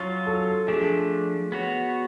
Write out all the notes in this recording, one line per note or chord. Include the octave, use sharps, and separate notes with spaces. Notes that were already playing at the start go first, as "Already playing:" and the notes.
Already playing: F#3 C#4 F4 C#5
A4
F3 A3 D4 G#4
B3 F#4 C#5